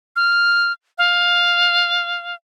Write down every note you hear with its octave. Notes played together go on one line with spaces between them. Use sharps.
F6
F5